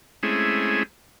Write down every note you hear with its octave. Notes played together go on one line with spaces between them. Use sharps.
G#3 A3 C4 C#4 E4 G#4